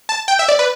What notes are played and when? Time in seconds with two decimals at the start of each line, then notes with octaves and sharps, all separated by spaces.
0.09 A5
0.28 G5
0.39 E5
0.48 D5
0.59 B4